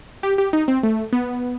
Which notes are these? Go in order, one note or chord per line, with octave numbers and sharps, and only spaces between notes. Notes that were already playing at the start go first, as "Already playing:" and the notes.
G4
G4
D#4
C4
A3
B3